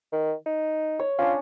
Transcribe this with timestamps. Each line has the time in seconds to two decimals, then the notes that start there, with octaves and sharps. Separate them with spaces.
0.12 D#3
0.46 D#4
0.99 C#5
1.18 C#4 D4 F4